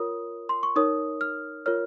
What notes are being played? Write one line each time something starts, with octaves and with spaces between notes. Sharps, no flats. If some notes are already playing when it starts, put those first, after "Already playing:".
Already playing: F4 A#4 C#5 D#6
C6
C#6
D#4 A#4 C#5 D#6
F6
F4 A#4 C#5 F6